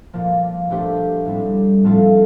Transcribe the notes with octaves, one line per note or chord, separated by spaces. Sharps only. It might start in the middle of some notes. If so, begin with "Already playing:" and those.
A#2 F3 A#3
A#2 A3 D4 G4 C5
A2 G3 C4
A2 F3 A3 C4 F4